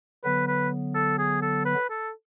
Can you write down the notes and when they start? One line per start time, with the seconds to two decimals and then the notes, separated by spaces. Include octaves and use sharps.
0.24 D3 F#3 B3 B4
0.47 B4
0.95 A4
1.18 G#4
1.42 A4
1.65 B4
1.89 A4